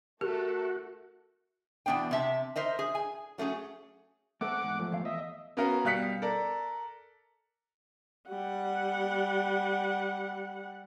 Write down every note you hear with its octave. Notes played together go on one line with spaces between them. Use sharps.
A3 F#4 G4 A4 A#4
E2 B2 B3 D4 G5
C3 E5 A5
A#4 C5 D#5 E5
G#4
G#5
F#3 A3 C#4 G#4
A3 C4 A4 F#5 D6
E2 G#2
F3 A3
E2 F5
D#5 E5
B3 C#4 F#4 A#4 F5 F#5
B2 G3 F5 F#6 B6 C#7
A4 A#4 D5
G3 F#5